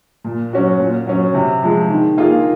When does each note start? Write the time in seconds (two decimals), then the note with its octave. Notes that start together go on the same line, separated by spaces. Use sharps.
0.24 A#2
0.53 F#3 C#4 F#4
0.79 A#2
1.07 F#3 C#4
1.34 C3
1.63 F3 G#3
1.90 D#3
2.17 A#3 F4 G#4